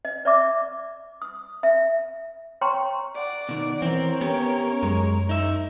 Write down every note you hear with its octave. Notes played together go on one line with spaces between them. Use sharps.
D#5
D5 E5 D6
D#6
E5
C#5 G5 A#5 C6 C#6
D5 F#5
B2 D#3
E3 C4 A#4 C#5
B3 C#4 G4
F#2 G#3
D#4 E5